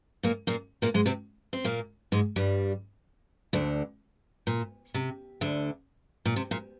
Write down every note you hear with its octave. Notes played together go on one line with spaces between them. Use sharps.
A#2 A#3
A#2 A#3
A#2 A#3
G#2 G#3
C3 C4
C4
A#2 A#3
G#2 G#3
G2 G3
D2 D3
A#2
C3
D2 D3
A#2
C3
A#2